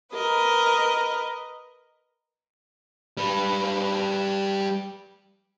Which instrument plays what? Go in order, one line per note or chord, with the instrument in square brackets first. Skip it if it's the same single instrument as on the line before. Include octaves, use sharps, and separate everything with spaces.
[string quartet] A#4 B4 D#5
[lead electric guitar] G3 B4